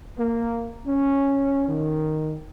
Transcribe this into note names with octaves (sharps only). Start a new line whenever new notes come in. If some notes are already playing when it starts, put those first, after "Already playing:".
A#3
C#4
D#3